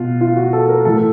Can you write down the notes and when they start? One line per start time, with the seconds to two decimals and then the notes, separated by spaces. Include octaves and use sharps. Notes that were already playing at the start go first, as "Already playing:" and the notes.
Already playing: B2 F4
0.21 F4
0.36 F#4
0.53 A4
0.69 A#4
0.85 A2 E3 A4